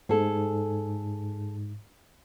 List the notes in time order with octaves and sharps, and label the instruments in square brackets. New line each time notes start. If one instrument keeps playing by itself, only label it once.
[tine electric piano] G#2 [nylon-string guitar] G#4 A4